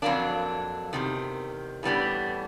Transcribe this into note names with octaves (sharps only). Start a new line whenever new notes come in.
F2 D3 F#3 A#3 D4
E2 C3 D#3
A2 E3 G3 B3 D4